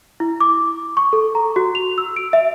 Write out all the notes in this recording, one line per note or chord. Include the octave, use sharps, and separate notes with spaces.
E4
D6
C#6
A4
A#5
F#4
F7
E6
D7
E5